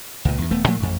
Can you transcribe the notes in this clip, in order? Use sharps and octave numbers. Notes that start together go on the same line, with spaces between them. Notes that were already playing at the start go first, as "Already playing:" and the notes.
C#2 A#2
E2 G2
D#1 A3 B3
A2 F3 A3 A#3
A1 F2